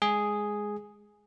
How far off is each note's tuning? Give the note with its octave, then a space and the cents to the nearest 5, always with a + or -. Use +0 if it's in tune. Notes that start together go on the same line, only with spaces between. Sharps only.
G#3 +0 G#4 +0